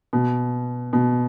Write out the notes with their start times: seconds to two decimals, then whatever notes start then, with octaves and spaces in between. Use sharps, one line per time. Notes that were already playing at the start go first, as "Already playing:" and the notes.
0.13 B2
0.93 B2